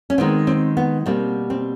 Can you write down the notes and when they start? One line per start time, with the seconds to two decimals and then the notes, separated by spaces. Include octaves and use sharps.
0.10 C#4
0.18 D#3 G#3 B3 C4
0.47 C4
0.77 B3
1.06 B2 G3 A#3 C4
1.50 C4